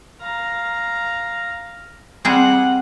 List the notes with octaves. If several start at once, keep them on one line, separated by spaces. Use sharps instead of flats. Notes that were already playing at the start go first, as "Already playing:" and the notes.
F5 A#5
G3 C4 G#4 F#5